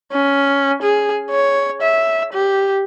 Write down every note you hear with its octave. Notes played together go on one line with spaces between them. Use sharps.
C#4
G#4
C#5
E5
G4